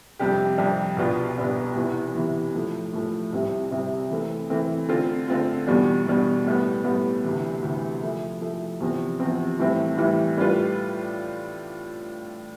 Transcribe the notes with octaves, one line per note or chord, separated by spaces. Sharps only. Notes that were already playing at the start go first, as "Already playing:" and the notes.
F2 C3 G3 D4 G4
F2 C3 G3 D4 G4
C2 B2 B3 D4 F4
C2 B2 B3 D4 F4
E2 C3 E3
E2 C3 E3
A2 F3 A3
A2 F3 A3
C2 C3 G3 C4 E4
C2 C3 G3 C4 E4
E3 A3 C4
E3 A3 C4
D3 A3 C4 F4
D3 A3 C4 F4
E2 B2 G3 D4
E2 B2 G3 D4
A2 G3 B3
A2 G3 B3
D2 C3 E3
D2 C3 E3
F3 A3 E4
F3 A3 E4
E2 C3 F3 C4
E2 C3 F3 C4
A2 E3 G3 C4 E4
A2 E3 G3 C4 E4
A2 G3 D4 F4 B4